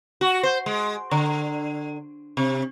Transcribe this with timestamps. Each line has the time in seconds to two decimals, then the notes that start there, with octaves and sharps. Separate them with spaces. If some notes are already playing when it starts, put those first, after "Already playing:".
0.21 F#4
0.43 C5
0.66 G#3
1.11 D3
2.37 C3